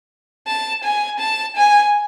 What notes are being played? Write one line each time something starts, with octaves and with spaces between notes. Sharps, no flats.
A5
G#5
A5
G#5